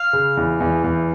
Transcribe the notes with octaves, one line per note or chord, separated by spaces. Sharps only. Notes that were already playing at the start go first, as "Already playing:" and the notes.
Already playing: F5
C#3
E2
E2
E2